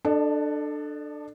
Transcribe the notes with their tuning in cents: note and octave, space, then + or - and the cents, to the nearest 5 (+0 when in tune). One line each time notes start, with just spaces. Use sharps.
D4 +20 A4 +0 D#5 -25